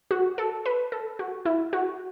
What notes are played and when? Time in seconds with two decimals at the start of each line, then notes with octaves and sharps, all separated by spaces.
0.11 F#4
0.38 A4
0.66 B4
0.92 A4
1.19 F#4
1.45 E4
1.73 F#4